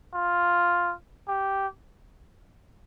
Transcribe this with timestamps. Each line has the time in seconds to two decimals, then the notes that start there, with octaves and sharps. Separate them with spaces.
0.14 F4
1.28 G4